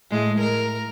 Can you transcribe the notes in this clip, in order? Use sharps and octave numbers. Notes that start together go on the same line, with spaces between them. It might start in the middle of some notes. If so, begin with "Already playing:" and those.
A2 G#3
A#4